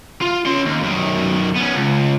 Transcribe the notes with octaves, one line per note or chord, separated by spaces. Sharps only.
F4
C#4 C6
D#2
F#2 D#3
B3 C#4
C#2